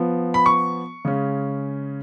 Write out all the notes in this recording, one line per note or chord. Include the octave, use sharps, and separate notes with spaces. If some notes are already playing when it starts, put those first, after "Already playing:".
Already playing: F3 B3
B5
C#6
C#3 G#3 C#4